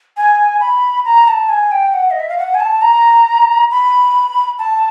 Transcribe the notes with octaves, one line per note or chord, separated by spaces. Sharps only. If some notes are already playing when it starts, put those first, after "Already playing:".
G#5
B5
A#5
A5
G#5
G5
F#5
D#5
E5
F5
F#5
G#5
A5
A#5
B5
A5